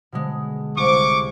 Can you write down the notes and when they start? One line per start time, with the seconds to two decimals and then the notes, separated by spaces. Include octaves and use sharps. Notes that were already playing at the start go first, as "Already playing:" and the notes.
0.12 B2 D3 G#3
0.77 C2 C#6 D6